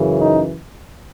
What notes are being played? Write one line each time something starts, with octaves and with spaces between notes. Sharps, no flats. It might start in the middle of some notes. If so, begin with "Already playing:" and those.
Already playing: F#2 C#3 E3
D#4